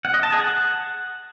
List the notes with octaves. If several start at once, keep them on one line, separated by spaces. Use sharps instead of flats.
F#5
D#5
A5
G#4
F#5